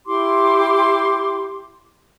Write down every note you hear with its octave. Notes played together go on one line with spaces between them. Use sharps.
E4 G4 C6 D6